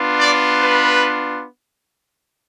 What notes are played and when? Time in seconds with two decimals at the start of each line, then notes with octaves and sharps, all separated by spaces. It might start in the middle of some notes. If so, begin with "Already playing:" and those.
Already playing: B3 D4 F4
0.18 D5
0.61 B4